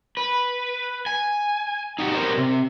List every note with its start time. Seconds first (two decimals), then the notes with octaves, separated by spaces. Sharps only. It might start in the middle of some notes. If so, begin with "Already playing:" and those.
0.17 B4
1.06 G#5
1.99 D#4 F#4 G4
2.14 B3 G4 A#4 C5 C#5
2.37 C3